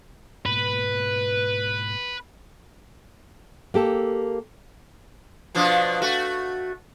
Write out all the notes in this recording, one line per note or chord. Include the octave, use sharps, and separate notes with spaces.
G#2 B2 A#3 B4
A#3 G4 A4
B2 F3 D4
A3 F#4